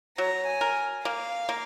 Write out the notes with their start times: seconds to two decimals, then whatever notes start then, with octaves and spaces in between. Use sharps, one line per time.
0.18 F#3 A#5
0.46 G#5
0.61 A#4
1.05 A#3 F5
1.49 A#3